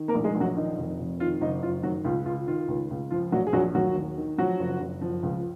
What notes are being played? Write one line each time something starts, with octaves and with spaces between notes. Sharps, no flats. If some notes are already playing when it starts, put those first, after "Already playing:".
Already playing: D#3
A#3 A#4
A#1
G#3 G#4
A#1
F#3 F#4
D#3 D#4
F1
F1
D#3 F4
F#1 D#4
F#1 F4
D#3 F#3 F#4
C#2 F4
C#2 F4
D#3 F4
C#2
C#2
F3 F4
A#1 F#3 F#4
G#4
A#1 F#3 F#4
D#2 F#3 F#4
D#2
D#3
F3 F#3 F#4
F#1
F#1
F3
C#2